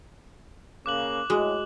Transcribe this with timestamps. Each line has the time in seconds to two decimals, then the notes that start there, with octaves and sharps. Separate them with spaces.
0.86 C#3 A#3 D6 F#6 F#7
1.30 A2 G#3 F#4